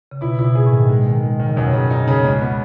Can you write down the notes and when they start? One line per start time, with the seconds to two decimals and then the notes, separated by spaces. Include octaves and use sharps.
0.11 C#3
0.21 B2 E4
0.39 E4
0.44 B2
0.55 G#4
0.66 A2
0.72 D#3
0.89 G#3
1.06 D#3
1.23 G#3
1.40 D#3
1.48 C#3
1.56 F#2 B2
1.73 C#3
1.90 D#4
2.08 C#3
2.24 C#2
2.41 B3